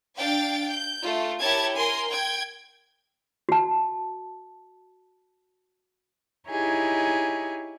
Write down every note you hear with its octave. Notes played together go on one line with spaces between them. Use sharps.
D4 F5 G5 A6 D7
G6
A3 F4
E4 G4 A#4 C#5 A5 G#6
A#4 G#5 C6
G5 G#6
F#4 A5
D#4 E4 G4 G#4 C#5